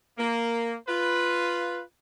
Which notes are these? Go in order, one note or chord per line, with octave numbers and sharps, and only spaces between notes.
A#3
F4 B4